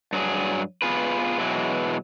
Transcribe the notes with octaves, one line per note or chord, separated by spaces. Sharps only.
G2 F#3 G#4
B3 F4 G#4 B4
B2 E3 F#3 G#3